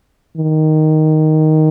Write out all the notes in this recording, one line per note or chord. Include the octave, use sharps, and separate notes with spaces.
D#3